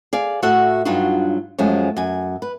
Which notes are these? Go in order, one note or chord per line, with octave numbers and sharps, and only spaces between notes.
G#4 D5 F5
A2 F#4 A4 E5 F#5
G2 F#3 D4 D#4 F4 F#4
F#2 F3 G#3 A3 C#4
F#2 G#5
B4